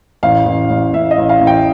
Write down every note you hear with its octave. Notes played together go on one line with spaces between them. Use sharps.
A1 F5
A1
A1
A1 E5
D#5
A1
F5
A1
G5